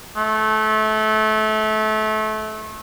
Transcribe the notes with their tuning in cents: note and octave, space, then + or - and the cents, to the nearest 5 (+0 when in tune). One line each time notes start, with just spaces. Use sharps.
A3 -25